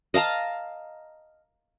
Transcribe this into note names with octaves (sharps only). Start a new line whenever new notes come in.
D#5 F5 A5 A#5